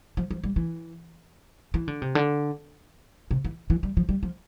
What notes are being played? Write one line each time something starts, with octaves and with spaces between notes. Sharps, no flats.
F3
F3
G3
E3
E3
D3
C3
D3
C3
E3
E3
G3
F3
G3
F3